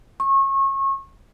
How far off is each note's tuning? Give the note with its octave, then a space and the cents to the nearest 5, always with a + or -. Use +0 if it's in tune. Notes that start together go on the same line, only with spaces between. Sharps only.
C#6 -30